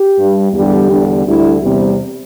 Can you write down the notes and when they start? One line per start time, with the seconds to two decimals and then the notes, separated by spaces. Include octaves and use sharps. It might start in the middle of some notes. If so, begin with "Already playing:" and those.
Already playing: G4
0.17 G2 G3
0.53 E2 D3 G3 G4
0.89 E2 D3 G3
1.25 D2 D3 G3 E4
1.61 E2 C3 G3 C4